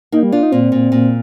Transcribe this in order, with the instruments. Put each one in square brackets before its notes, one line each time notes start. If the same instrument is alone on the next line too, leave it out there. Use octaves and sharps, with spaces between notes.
[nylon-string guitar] A#3 [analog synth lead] D#4
[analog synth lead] G3
[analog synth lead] D4 [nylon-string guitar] F4
[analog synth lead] D#4
[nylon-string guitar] A#2 [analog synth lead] C4
[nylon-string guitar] A#2
A#2